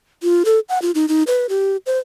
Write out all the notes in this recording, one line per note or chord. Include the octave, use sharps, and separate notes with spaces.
F4
A4
F#5
F4
D#4
D#4
B4
G4
C5